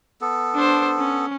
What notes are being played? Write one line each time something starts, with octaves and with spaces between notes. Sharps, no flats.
B3 A4
D4 C5
C#4